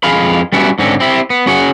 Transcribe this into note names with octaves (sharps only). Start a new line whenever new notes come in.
F2 G#3 G#4 F5 B5
G3 B3 C#4 E4 F#4 G4
G#2 D3 C4 C#4
C4 E4 G4
B3
C#4 F#4 G#4 C#5 F#5